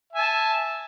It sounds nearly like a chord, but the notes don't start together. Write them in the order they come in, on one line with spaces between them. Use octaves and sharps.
E5 G#5 A5